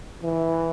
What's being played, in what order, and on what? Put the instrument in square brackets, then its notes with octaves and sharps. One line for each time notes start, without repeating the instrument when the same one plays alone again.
[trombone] E3